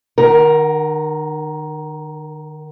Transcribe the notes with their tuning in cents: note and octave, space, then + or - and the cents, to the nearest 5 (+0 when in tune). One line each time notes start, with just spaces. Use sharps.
D#3 -40 A#4 +10 F#5 +0